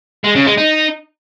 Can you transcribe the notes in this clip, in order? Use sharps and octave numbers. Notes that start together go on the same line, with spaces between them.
G#3
C#3
G#3
D#4